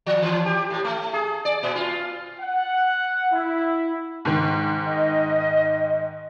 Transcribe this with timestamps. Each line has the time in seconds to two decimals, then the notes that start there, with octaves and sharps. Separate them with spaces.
0.06 F3
0.22 E3
0.45 G4
0.70 A2
0.84 A3
1.13 G#4
1.45 D5
1.63 A#2
1.75 F4
2.40 F#5
3.32 E4
4.25 G#2 D#3
4.85 D#5